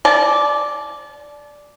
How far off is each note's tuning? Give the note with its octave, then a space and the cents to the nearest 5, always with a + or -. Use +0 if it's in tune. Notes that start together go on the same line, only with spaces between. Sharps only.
D5 -5 A5 -35